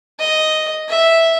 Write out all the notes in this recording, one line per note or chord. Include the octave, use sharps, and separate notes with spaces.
D#5
E5